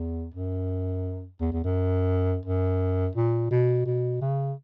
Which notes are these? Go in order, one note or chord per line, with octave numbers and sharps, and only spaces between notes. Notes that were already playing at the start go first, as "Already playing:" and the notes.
Already playing: E2
F#2
E2
E2
F#2
F#2
A#2
B2
B2
C#3